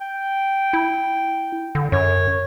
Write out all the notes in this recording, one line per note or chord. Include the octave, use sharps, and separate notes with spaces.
G5
E4
D3
F#2 C#5